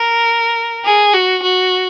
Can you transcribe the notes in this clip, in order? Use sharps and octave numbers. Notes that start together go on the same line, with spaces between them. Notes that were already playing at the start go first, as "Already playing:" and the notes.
Already playing: A#4
G#4
F#4
F#4